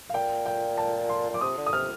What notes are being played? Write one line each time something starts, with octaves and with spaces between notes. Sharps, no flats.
F5
A#2 G5
G5
A5
C6
A#2 D6
C3 D#6
D3
D#6
C3 F6